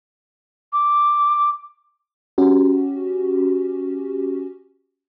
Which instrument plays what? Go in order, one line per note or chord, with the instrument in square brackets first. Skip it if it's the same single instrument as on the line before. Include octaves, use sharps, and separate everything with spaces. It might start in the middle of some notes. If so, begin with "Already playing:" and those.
[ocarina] D6
[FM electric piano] C#4 F#4 G4